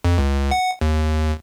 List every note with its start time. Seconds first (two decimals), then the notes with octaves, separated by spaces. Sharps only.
0.05 F2
0.18 C#2
0.51 F#5
0.81 D#2